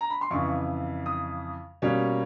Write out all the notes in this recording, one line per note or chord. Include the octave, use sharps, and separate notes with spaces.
A#5
B5
C6
F2 C#3 E3 C#6
D#6
B2 G3 A#3 C#4